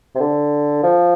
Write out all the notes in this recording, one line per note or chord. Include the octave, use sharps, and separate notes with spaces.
C3
D3
F3